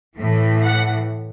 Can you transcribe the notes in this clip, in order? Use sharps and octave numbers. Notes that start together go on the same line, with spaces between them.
A2 E3
F#5